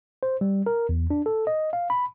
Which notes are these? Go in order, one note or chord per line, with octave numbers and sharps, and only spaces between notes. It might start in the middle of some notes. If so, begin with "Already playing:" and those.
C5
G3
A#4
E2
D4
A4
D#5
F5
B5